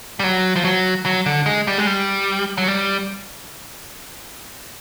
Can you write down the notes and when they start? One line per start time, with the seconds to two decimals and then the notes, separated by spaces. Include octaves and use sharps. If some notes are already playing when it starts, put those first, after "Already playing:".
0.20 G3
0.24 F#3
0.56 F3
0.64 F#3
1.06 F#3
1.26 D3
1.46 G#3
1.67 G3
1.78 G#3
1.87 G3
2.58 F#3
2.68 G3